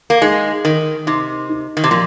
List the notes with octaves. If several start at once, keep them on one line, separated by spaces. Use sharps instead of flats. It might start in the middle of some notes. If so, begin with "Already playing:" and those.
A#3
G#3 D#4
D#3 A#4
C3 D#4
D#4
D#3
C3
A#2 F3